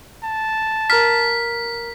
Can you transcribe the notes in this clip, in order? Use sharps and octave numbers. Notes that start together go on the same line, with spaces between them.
A5
A#4 A#5 F6 B6